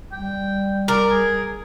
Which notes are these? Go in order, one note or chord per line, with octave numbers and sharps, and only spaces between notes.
G3 G5
A#4 D5
G#4